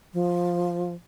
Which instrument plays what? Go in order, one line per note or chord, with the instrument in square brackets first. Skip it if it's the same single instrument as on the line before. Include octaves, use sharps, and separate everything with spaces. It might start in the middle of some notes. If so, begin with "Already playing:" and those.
[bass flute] F3